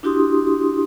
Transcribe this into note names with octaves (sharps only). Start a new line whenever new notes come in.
D4 E4 F#4 G4 C6 D#6